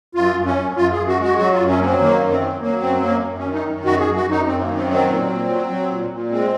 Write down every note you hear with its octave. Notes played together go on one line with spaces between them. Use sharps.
F#2 F4
F#2
C#4
F#2
F#2 F4
G#4
F#2
F#4
G#3
F#4
F#3 F#4
F4
F#2
C#4
F#3 A#3 C4
D#3 A#3
F#2
C4
F#3
F#3 A#3
F#2 C4
F#2 A#3
F#2
D#3 C#4
D#4
F#2
F#2 F#4
G#4
F#2
F#4
F#2
D#4
F#2 C4
D#3 A#3
C4
F#3 C4
A#2
A#2
F#3
F#3
A#2
A#2
G#3 C4